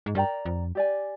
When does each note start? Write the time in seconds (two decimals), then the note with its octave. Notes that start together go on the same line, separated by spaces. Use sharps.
0.06 G#2
0.15 G2 A#4 D5 G5 A#5
0.45 F2
0.75 G4 D5 G#5